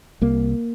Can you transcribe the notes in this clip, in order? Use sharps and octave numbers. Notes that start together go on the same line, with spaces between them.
C2 A#3